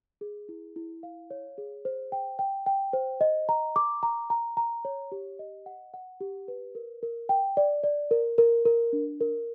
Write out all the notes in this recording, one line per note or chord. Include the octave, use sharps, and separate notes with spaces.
G#4
E4
E4
F5
C#5
G#4
C5
G5
G5
G5
C5
D#5
A#5
D6
A#5
A#5
A#5
C#5
G4
D#5
F#5
F#5
G4
B4
A#4
A#4
G5
D5
D5
A#4
A#4
A#4
D4
A#4